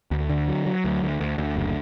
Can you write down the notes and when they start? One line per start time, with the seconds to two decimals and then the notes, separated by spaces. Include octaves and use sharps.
0.11 D2
0.30 D3
0.48 F#3
0.66 F#3
0.85 D2
1.03 D2
1.21 D2
1.38 D2
1.56 F#1